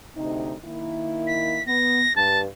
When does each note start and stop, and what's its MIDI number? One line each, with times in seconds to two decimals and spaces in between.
0.16 0.55 38
0.16 0.55 48
0.16 0.55 63
0.64 1.61 51
0.64 1.61 58
0.64 1.61 64
1.26 1.65 95
1.66 2.05 59
1.66 2.13 94
2.15 2.46 43
2.15 2.39 81